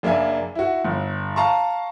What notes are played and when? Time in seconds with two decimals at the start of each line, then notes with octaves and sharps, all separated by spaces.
0.03 F#1 A#3 D4 E5 G#5
0.55 E4 F#4
0.85 G1
1.36 F5 A5 A#5 C6 C#6